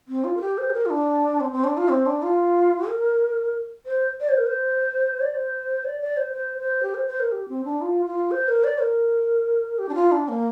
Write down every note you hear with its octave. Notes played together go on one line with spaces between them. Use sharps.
C4
F4
A#4
G4
C5
G4
A#4
F4
D4
C4
C4
D4
F4
C4
D4
F4
A#4
C5
D5
C5
A#4
C5
D5
C5
D5
D5
C5
C5
C5
G4
C5
C5
A#4
G4
C4
D4
F4
F4
C5
A#4
D5
A#4
G4
D4
F4
D4
A#3